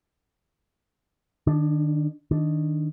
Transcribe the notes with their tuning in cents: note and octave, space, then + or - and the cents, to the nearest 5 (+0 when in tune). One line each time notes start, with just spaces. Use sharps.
D#3 -35 D4 +0
D#3 +0 D4 +0